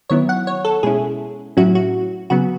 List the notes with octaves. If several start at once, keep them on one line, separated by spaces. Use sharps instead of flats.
D#3 F#3 B3 E4 C#5
F#5
C#5
A4
B2 G#3 C#4 E4 G#4
A2 F#3 C#4 E4 F#4
F#4
C#3 F#3 B3 F#4